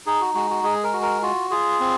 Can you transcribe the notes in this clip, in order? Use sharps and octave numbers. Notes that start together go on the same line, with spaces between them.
D#4 G#4
F#4
G#3 F#4
F#4
G#3 G#4
A#4
F#4
A#4
F4 F#4
F4 G#4
C4